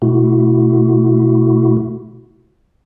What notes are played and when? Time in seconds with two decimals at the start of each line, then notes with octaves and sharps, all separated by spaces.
0.02 B2 A3 E4 F#4